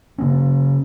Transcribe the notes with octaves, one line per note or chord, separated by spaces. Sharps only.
C#3 A#3 C#4